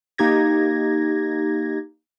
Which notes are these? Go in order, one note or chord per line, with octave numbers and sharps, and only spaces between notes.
A#3 D#4 G4 G#6 A#6